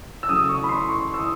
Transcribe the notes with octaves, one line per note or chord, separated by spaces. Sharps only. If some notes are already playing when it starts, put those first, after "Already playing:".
E6
C#3 F#3 A3 D#6
C#6
B5
C6
C#6
E6
D#6